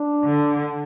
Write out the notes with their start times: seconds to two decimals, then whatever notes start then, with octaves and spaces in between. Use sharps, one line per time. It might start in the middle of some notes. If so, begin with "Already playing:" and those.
Already playing: D4
0.24 D3